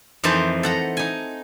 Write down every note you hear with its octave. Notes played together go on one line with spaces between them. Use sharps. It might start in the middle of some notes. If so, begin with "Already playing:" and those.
F2 E3 D#4 C5 A5
A4 F#5 A#5
D#4 G#5